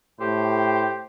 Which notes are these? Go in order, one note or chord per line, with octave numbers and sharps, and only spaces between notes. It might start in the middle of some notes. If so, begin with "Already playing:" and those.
A2 G4 C5